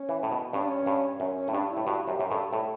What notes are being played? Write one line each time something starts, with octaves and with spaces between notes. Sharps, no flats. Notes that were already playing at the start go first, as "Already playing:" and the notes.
Already playing: C#4
E3
A2
B2
G2 C#4
D4
C#4
G2
F#2 C#4
C#4
A2
G2 D4
E4
A2
G2 F#4
F#2 G4
F#2
G2 A4
A2 A4